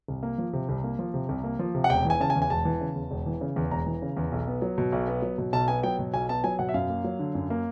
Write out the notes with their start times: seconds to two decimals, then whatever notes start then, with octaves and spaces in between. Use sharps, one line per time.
0.08 C2
0.23 A#3
0.38 F3
0.53 C3
0.69 C2
0.84 A#3
0.99 F3
1.14 C3
1.29 C2
1.44 A#3
1.59 F3
1.75 C3
1.84 F#5
1.90 E1 G5
2.05 E3 G#5
2.20 C#3 A5
2.30 G#5
2.35 E2
2.42 G#5
2.50 E1 A5
2.65 E3
2.81 C#3
2.96 E2
3.11 E1
3.26 E3
3.41 C#3
3.56 E2
3.71 E1 A#5
3.87 E3
4.02 C#3
4.17 E2
4.32 B1
4.47 B3
4.62 F#3
4.78 B2
4.92 B1
5.08 B3
5.22 F#3
5.38 B2
5.53 B1 A5
5.68 B3 G#5
5.83 F#3 G5
5.99 B2
6.13 B1 G#5
6.28 B3 A5
6.44 F#3 G#5
6.59 B2 F#5
6.69 E5
6.74 F#2 F5
6.90 A#3
7.04 F#3
7.19 D3
7.35 F#2
7.50 A#3